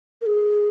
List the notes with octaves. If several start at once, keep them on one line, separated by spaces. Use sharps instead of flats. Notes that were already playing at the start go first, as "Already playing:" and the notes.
A#4
G#4